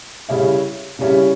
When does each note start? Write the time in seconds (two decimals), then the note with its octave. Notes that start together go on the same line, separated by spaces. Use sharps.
0.29 C#3 G3 C#4 E4
0.99 C#3 G3 C#4 E4